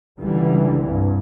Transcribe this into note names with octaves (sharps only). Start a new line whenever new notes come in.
C#2 D3 E3 G3
C2 G2